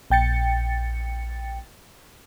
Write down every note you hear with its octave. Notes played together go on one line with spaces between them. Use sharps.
A#1 G5 A6 C#7